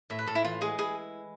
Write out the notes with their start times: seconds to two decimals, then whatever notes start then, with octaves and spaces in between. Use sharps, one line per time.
0.10 A2 E5
0.19 B4
0.27 A2 A4
0.35 E4
0.44 E3 F4
0.61 G#3 G#4
0.78 E4 G#4